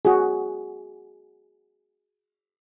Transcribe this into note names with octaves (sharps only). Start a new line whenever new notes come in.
F#4 G#4